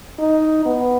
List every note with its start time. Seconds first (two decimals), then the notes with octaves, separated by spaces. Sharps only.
0.19 D#4
0.65 B3